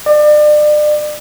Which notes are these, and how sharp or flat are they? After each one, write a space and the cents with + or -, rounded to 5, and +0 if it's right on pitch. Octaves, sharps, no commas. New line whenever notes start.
D5 +35